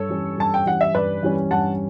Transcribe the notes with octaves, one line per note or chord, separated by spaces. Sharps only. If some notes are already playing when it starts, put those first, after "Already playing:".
Already playing: G2 A4 C#5
E3 G3 C#4
G2 A5
G5
E3 G3 C#4 F#5
E5
G2 B4 D5
E3 G3 C#4
G2 F#5 A5